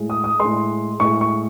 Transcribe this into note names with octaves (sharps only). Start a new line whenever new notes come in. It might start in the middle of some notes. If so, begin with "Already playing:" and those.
Already playing: A2 G#3
D#6
D#6
A2 G#3 C6
A2 G#3 C#6
C#6